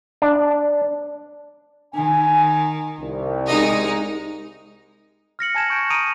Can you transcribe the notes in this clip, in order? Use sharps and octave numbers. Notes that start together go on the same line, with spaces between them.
D4
D#3 G#5
C2
G#3 D#4 D#5
F6 A#6 C#7 F#7
G#5 A5 G#6 E7
C#6 G6 D7
A#5 D#6 D7 D#7 F7